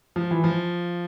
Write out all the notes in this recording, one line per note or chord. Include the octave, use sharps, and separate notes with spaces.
F3
E3
F3